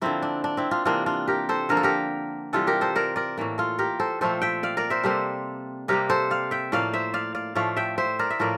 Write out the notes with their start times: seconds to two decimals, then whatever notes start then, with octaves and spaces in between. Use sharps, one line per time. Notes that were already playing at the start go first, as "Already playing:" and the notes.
0.01 D3 F3 A#3 C4 E4
0.22 D4
0.44 D4
0.57 C4 E4
0.71 D4 F4
0.85 C3 E3 A#3 D4 F4
1.06 D4 F4
1.28 G4 A#4
1.49 A4 C5
1.69 D3 F3 A#3 A#4
1.77 A4
1.83 G4 A#4
2.53 C3 E3 G3 F4 A4
2.67 G4 A#4
2.81 A4 C5
2.95 A#4 D5
3.16 A#4 D5
3.37 A2 E3 A#3
3.58 F4 A4
3.79 G4 A#4
4.00 A4 C5
4.21 A#2 F3 A3 C4 A4 C5
4.42 E5 G5
4.63 D5 F5
4.77 A#4 D5
4.90 C5 E5
5.03 C3 G3 A#3 A4 C5
5.88 C3 G3 A#3 G4 A#4
6.10 A4 C5
6.30 D5 F5
6.51 E5 G5
6.72 A2 F3 A#3 D5 F5
6.93 C5 E5
7.14 D5 F5
7.35 D5 F5
7.55 A2 F3 A3 D5 F5
7.77 E5 G5
7.98 C5 E5
8.19 A#4 D5
8.30 E5
8.39 A2 F3 A#3 A#4 D5